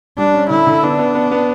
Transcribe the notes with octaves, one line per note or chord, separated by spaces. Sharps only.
G3 D4
C#4
D3 E4
D3
B3 D4
B3
B3
B3